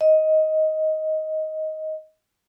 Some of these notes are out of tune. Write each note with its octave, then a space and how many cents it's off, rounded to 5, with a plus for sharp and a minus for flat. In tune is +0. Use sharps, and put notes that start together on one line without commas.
D#5 +10